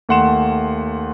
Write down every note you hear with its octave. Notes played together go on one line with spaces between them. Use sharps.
D#2 A3 F#5 C6 E7